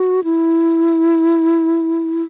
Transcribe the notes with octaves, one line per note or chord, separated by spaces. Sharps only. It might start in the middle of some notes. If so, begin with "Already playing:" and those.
Already playing: F#4
E4